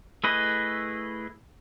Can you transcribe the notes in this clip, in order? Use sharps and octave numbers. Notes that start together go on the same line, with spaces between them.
A3 E4 G#4 B4 D#5